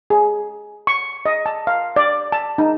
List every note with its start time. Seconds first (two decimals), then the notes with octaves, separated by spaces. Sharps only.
0.10 G#4
0.87 C#6
1.26 D#5
1.46 A5
1.67 F5
1.96 D5
2.32 A5
2.58 D#4